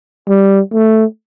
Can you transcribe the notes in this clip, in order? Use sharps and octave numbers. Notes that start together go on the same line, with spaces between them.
G3
A3